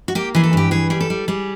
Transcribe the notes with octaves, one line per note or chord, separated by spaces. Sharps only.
F#4
A#3 G4
E3 G#4
A4
G2 G4
E3 G#4
G3 G#4
A4
G3
G3 G#4